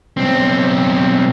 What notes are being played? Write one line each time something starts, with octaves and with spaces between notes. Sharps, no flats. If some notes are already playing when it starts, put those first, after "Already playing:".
B1 C4